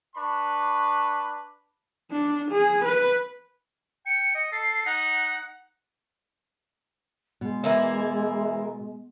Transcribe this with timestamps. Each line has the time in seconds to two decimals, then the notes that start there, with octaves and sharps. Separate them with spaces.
0.16 D4 B4 B5 C#6
2.12 D4
2.51 G#4
2.85 B4
4.06 G5 C#7
4.35 D#5
4.52 A4 C7
4.86 D#4 F#5
7.41 B2 G#3
7.64 E3 A#3 E4